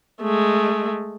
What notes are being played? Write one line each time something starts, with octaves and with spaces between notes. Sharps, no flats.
G#3 A3